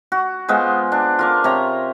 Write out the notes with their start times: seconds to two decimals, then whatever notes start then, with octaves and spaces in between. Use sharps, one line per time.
0.12 F#4
0.48 G#3 B3 F4 C5
0.92 D4
1.19 F4 A#4 D6
1.44 C3 C#5 A#5